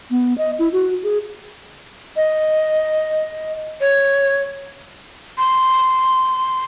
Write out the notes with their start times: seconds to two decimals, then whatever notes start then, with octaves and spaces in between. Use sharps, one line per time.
0.11 B3
0.38 D#5
0.59 E4
0.73 F#4
1.03 G#4
2.17 D#5
3.80 C#5
5.38 C6